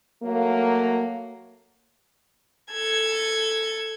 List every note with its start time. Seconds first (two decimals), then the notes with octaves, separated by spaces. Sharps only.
0.23 F#3 A3 A#3
2.72 A4 G#6